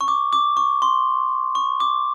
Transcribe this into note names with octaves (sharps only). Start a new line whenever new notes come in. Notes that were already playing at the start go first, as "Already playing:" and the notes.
C#6
D6
D6
C#6
C6
C#6
D6